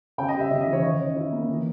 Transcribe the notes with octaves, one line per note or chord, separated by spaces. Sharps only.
C#3 G5
D#5
G3
E5
C#3 E5
D#5
E3
C#5
D#3 D#5
C#4
E4
A#3
E3